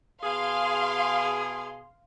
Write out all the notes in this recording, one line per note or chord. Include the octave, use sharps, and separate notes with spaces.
B2 G#4 F5 C6